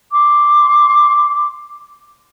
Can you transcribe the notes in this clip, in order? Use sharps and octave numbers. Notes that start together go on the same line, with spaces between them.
C6 D6